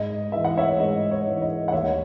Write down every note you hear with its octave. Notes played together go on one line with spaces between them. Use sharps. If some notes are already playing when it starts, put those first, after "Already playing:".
Already playing: G#2 D#5
E3 G#3 E5
F#5
C#5 E5
G#2 D#5
C#5
E3 G#3
D#5
F#5
D#2 C#5 E5